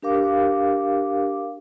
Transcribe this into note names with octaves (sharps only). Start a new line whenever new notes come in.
D4 G4 A#4 F5 D6